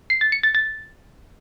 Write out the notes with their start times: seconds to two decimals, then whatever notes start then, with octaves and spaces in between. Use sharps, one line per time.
0.10 C7
0.21 A6
0.32 C#7
0.43 A6
0.55 A6